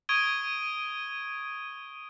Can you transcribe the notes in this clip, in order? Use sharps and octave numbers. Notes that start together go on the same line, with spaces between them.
C#6 D#6 G#6 D7 D#7 G7